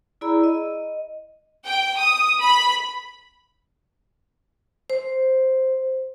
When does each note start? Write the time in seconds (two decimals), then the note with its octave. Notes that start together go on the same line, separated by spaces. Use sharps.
0.21 E4 G#4 D5 A#5 B5 E6
0.44 D#5
1.66 G5
2.00 D#6
2.41 B5
4.90 C5